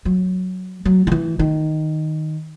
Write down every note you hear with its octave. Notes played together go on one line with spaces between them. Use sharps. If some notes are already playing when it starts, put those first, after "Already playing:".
F#3
F#3
D#3
E3
D#3